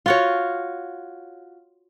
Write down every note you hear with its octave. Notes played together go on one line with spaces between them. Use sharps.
F4 F#4 C#5